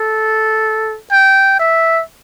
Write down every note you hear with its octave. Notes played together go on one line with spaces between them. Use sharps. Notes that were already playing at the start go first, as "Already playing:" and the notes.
Already playing: A4
G5
E5